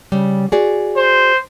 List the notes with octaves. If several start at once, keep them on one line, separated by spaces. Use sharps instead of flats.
C#3 G3
F#4 G#4 D5
C5